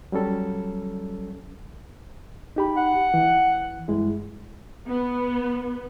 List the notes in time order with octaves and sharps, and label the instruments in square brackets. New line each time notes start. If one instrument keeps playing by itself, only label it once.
[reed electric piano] F#3 G3 C#4 A4
D#4 G4 B5
[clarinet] F#5
[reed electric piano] E3
G2 G#3 E4
[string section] B3